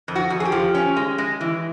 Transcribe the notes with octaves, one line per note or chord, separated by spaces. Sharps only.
F2
F#4
F2
G#4
G4
F3
C#4
G#3
G#3
E3